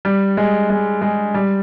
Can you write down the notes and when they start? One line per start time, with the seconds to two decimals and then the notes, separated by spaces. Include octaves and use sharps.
0.05 G3
0.37 G#3
0.70 G#3
1.02 G#3
1.34 G3